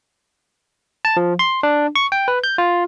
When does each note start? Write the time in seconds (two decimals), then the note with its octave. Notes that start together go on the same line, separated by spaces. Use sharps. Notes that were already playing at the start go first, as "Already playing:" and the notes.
1.05 A5
1.17 F3
1.39 C6
1.63 D4
1.96 C#6
2.12 G5
2.28 B4
2.44 G6
2.58 F4